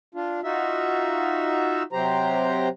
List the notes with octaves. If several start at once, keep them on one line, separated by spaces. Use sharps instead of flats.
D4 F4
D#4 F4 F#4 E5
C3 F#3 G4 C5 A#5